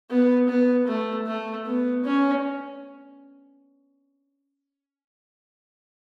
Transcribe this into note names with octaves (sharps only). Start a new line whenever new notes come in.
B3
B3
A3
A3
B3
C#4